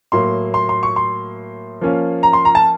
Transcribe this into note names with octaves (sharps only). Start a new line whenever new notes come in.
A2 F#3 A#3 C6
C6
C6
C#6
C6
F3 A#3 C#4 F4
A#5
C6
A#5
A5